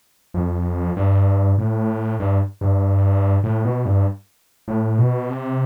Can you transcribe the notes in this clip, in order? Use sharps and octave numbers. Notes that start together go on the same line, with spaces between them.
F2
G2
A2
G2
G2
A2
B2
G2
A2
B2
C3